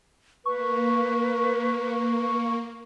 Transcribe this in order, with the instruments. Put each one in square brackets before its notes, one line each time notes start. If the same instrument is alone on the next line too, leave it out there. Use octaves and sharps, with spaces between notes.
[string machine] A#3 [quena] B4 [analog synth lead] C#6